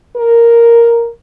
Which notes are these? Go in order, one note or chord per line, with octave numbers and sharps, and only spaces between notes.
A#4